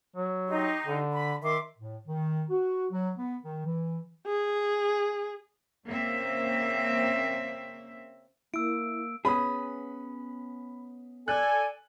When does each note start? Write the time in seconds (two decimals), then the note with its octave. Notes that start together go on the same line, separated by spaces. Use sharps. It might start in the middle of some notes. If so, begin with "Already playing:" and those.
0.16 F#3
0.48 D#4 G4 C6
0.87 D3
1.13 B5
1.43 D#3 E5 C6 D6
1.78 A2
2.07 D#3
2.50 F#4
2.91 F#3
3.17 B3
3.42 D#3
3.66 E3
4.27 G#4
5.85 C#3 A#3 C4 E5
8.54 A#3 E4 E6 D7
9.25 B3 C#4 G#4 B5 D#6
11.28 A4 D5 G#5 F#6